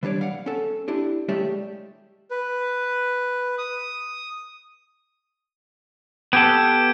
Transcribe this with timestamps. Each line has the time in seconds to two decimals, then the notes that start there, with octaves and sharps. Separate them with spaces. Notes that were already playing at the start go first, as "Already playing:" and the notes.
0.03 E3 G3 D4 C#5 D5
0.21 F5 F#5
0.46 C#4 A4
0.88 D4 E4 G4
1.29 G#3 A3 C#4 G4 D5 E5
2.31 B4
3.58 D#6
6.33 B3 G4 A4 G6 G#6 D7